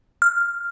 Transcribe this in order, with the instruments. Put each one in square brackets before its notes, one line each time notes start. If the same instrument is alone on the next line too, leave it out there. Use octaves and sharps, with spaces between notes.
[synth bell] F6